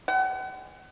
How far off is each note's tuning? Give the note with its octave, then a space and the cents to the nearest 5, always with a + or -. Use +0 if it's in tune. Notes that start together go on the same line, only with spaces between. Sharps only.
G#3 -35 F#5 +35